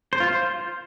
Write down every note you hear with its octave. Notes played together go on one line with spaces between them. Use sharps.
C5
F4
C5